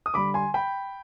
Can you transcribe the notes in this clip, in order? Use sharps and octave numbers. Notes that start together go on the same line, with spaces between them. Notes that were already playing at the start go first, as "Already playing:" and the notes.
D#6
D3 G3 B5 D6
G#5 C6
G5 B5